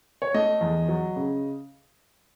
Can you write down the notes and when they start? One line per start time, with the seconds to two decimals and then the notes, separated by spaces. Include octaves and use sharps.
0.22 C#5
0.34 A3 D#5
0.61 E2
0.88 F#3
1.16 C#3